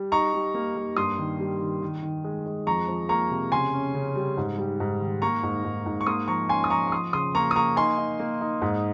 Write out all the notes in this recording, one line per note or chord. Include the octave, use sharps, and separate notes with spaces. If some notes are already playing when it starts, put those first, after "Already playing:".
Already playing: G3
D#4 A#5 C#6
G3
A#3
A#3
G2 C6 D#6
D#3
G3
D#3
D#3
D#3
G#3
G#3
F2 A#5 C#6
F3
A#3 A#5 C#6
C3
C#3 G#5 C6
C#4
C#3
G3
G#2
G3
G#2
D#3
A#3 A#5 C#6
G#2
G#2
G#2
C#6
A#3 C6 D#6
F3 A#5 C#6
C#4 G#5 C6
D#6
F3 A#5 C#6
C#6
F3 C6 D#6
C#3 C6 D#6
A#3 A#5 C#6
D#6
A#3 A#5 C#6
D#4 G#5 C6
D#4
A#3
D#4
G#2